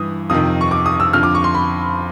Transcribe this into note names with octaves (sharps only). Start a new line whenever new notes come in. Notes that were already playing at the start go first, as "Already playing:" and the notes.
Already playing: G2 E3 D#6
F2 C3 D#3 D#6
C#6
D6
D#6
E6
F2 D3 F6
D6
C#6
C6
B5